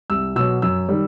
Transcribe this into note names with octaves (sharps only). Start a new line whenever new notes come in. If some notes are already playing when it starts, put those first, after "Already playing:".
C2 E6
B2 F#3 E6
F#2 E6
D#3 G3